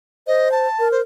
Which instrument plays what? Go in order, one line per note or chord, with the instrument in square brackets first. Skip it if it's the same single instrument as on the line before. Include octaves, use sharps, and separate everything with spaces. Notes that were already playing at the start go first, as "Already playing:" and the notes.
[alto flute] C5 [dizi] D#5
[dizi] A5
[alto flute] A#4
[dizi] C5